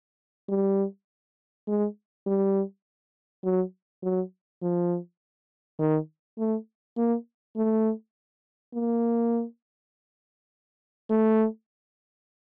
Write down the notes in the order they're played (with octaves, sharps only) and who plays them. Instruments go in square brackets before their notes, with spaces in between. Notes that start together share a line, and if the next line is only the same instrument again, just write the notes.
[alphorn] G3
G#3
G3
F#3
F#3
F3
D#3
A3
A#3
A3
A#3
A3